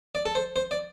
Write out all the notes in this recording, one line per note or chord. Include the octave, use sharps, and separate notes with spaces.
D5
A4
C5
C5
D5